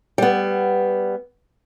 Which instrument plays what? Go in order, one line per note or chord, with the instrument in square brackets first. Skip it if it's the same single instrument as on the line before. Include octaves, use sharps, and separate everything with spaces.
[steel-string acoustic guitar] G3 B3